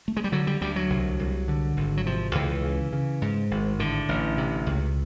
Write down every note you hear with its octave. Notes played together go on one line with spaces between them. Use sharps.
A3
G#3
G3
D3 F#3
G3
D2 G3
F#3
C2
C2
D3
G#1
F#3
C3 F3
C#2 E3
C#3
C#3
G#2
G#1
A2 D3
A1
C3
C#2